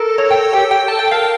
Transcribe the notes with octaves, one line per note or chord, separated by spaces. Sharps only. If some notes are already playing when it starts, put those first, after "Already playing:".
Already playing: A4 A#4
C#5
G5
G4 G5
A4
G5
A4 A5
A4 G5
A#4 F5